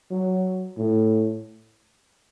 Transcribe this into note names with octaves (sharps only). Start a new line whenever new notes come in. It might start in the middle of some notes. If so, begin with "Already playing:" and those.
F#3
A2